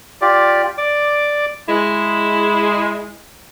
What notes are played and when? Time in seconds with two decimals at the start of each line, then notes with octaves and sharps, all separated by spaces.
0.21 F4 G4 D5
0.78 D5 D6
1.68 G#3 E4